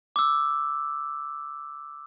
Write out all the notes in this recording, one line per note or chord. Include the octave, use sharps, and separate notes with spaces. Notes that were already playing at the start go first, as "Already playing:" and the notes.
D6 E6